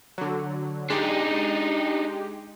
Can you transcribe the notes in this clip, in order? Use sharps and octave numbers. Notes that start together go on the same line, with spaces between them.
D3 F#3
G#3 D4 D#4 G4